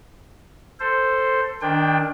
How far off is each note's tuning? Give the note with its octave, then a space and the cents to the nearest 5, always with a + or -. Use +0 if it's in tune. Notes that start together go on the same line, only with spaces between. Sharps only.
A4 +10 C5 +0
D#3 +0 D4 +0 G5 +25